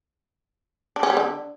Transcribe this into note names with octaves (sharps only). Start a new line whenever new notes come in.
D4
C#4
G3
D3